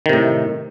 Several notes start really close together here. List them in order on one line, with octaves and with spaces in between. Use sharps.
D#3 C3 A2